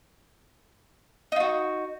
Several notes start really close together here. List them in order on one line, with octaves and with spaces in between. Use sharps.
D#4 F4 F#4